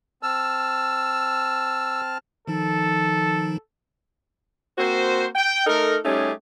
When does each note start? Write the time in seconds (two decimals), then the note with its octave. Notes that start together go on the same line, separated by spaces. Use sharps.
0.23 C4 A5 E6 F6
2.48 D#3 F3 D#4 A4
4.77 A#3 C4 F#4 C5
5.36 G5
5.66 A3 D#4 A4 A#4
6.04 G3 A3 C#4 D#4 G4 G#4